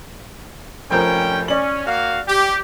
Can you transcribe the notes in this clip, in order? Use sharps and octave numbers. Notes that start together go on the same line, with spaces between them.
F1 F3 C#4 A#4 G5
C#4 D5 F#7
A#3 F#4 F5
G4